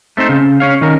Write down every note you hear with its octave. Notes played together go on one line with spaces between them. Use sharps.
A3 C4 D#4 C5
C#3
C#4 C#5 F5
D#3 C#4 A#4